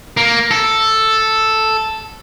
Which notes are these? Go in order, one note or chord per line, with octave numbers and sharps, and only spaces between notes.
A#3
A4